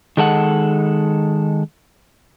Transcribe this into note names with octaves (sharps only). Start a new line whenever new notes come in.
D#3 G#3 A4 F#5